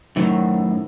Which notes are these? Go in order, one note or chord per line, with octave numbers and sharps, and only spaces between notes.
F#2 A2 D#3 F#3 C5